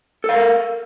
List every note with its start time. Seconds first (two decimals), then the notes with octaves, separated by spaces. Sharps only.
0.24 A4
0.29 F5
0.34 A#4